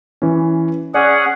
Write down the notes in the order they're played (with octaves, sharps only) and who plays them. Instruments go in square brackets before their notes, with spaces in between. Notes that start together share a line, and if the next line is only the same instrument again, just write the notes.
[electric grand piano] E3 C#4
[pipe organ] C#4 G#4 F#5 [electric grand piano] D5